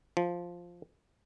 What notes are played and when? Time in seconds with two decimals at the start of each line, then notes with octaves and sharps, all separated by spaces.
0.17 F3